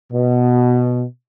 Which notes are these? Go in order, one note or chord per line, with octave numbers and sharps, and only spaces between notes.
B2